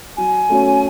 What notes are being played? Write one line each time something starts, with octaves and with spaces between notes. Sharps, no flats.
F#3 G#5
A3 C#4 F#4 C#5